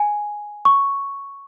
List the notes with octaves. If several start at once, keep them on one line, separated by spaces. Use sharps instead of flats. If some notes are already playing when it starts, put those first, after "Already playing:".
Already playing: G#5
C#6